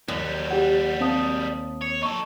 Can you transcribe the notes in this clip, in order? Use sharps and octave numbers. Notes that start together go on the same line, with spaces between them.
D#2 F#3 G3
G4 F#5
C4 F5 A5 D#6
C#5 C#7
D#4 A4 C#6